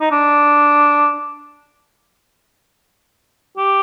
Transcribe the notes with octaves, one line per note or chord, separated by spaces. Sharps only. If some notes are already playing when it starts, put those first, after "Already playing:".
D#4
D4
G4